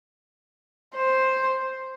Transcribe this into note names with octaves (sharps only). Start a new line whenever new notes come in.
C5